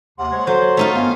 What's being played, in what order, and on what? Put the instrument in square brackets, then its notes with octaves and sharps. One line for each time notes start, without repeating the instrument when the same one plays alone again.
[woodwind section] D#2 C3 [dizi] F#5 [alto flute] C6
[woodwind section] G#3 C5 C#5
[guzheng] F#3 [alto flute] A4 [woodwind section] C5
[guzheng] A3 D#4 F4
[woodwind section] G2 D#3 C#4 [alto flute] B3 [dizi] F5